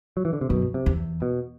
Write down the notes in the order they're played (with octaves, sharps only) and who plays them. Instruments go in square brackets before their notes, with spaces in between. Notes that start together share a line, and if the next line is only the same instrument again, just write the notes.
[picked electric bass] F#3
E3
D3
C3
[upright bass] F#2 [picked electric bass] B2
[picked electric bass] C3
[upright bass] E2
[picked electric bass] B2